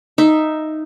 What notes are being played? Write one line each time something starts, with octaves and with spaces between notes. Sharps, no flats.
D#4 E5